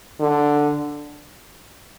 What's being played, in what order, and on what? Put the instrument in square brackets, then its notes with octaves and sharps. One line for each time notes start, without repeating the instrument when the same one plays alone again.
[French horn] D3